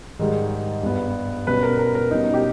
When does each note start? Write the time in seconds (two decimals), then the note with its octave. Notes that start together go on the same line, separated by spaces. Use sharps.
0.19 G#2 D#3 G3
0.83 G2 G3 B3
1.47 B2 G3 C#4 B4
1.63 A#4
1.79 A#4
1.95 A#4
2.11 B2 G3 C#4 D#4
2.34 G4